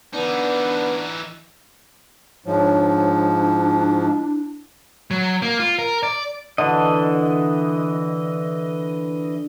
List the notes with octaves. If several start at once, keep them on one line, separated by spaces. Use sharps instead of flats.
E3 B3 D4 D#4
G#2 F3 D4 C#5
E4
F#3
A#3
F4
A#4
D5
D3 E3 D#5